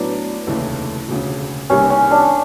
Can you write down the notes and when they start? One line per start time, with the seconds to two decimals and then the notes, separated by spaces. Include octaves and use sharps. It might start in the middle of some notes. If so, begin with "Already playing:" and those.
Already playing: A2 F#3 B3 D4
0.47 F1 D#2 C#3 E3 A3
1.08 E1 D2 C#3
1.70 C2 C3 D#3 G3 A#3 C#4
1.90 C#4
2.11 D4